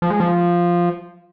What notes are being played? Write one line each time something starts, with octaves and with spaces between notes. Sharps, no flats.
F3
G#3
F3